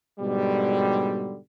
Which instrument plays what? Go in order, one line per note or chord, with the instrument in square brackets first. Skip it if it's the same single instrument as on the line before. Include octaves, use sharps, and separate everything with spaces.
[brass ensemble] G#2 B2 D3 F#3 G3